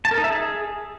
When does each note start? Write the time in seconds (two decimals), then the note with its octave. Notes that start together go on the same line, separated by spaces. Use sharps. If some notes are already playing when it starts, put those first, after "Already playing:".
0.05 A5
0.11 A#4
0.18 D#4
0.24 E5
0.30 G#4